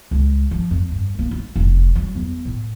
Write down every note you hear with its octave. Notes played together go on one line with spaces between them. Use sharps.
C#2
F3
F2
G2
A#3
F4
F1
F#3
E2
A2